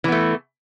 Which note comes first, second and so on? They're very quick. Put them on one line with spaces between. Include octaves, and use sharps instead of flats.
E3 B3 A3